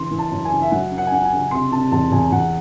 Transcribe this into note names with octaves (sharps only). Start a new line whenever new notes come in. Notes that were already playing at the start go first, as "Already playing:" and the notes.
Already playing: C#3 E3 C6
E3
A5
F#2
G#5
C#3
E5
F#3 F#5
C#4
F#5
G#5
C#4 F#5
G#5
C#3
C3 C6
C3 A5
E2 A5
E2 G#5
E2 F#5